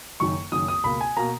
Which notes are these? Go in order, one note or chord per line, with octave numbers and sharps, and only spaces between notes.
F#1 F#2 D#3 C#6
F#1 F#2 D#3 D#6
D#6
C#2 B2 A#3 B5
G#5
B2 A#3 A#5